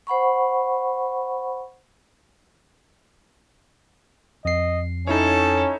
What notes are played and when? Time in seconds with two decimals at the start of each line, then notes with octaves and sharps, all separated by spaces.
0.07 C5 F#5 B5 C#6
4.45 F2 D#5 C7
5.07 C#4 D#4 E4 A4 C#5